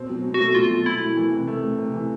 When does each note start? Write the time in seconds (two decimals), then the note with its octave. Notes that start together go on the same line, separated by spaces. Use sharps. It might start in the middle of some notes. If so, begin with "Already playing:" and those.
Already playing: B2 C4
0.09 F#3
0.24 B2
0.34 F#4
0.39 A3
0.54 B2 F4
0.70 F#3
0.85 B2 E4
1.01 A3
1.17 E3
1.32 C3
1.47 A3
1.64 C3
1.78 C3
1.94 E3